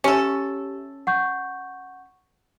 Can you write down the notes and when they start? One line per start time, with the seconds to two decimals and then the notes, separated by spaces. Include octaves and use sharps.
0.04 C#4 G4 A4 E5
1.07 F#5 C#6 G6